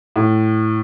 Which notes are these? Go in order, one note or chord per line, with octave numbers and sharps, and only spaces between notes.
A2